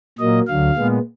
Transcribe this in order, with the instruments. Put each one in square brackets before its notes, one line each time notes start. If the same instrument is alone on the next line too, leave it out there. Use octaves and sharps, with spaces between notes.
[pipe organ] A#2 F#3 A#3 D#5
D2 D3 F#3 F5
A#2 G#3 B3